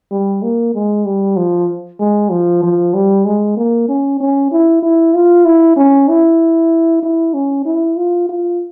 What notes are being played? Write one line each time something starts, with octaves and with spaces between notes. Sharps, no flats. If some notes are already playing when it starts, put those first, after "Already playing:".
G3
A#3
G#3
G3
F3
G#3
F3
F3
G3
G#3
A#3
C#4
C#4
E4
E4
F4
E4
C#4
E4
E4
C#4
E4
F4
F4